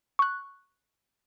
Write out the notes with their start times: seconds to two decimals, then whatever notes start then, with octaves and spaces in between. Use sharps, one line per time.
0.19 C#6 F#6